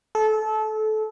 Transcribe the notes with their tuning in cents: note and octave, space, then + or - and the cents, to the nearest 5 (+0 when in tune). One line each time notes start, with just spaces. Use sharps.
A4 -25